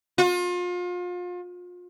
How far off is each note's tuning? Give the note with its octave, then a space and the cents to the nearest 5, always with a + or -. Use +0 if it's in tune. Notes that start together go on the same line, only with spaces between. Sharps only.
F4 +35